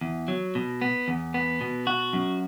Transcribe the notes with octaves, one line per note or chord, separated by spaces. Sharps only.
E2
F#3
B2
B3
E2
B3
B2
F#4
F#2